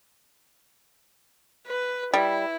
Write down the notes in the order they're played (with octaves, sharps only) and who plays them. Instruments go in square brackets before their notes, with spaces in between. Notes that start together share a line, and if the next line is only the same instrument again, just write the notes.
[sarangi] B4
[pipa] G3 [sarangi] E4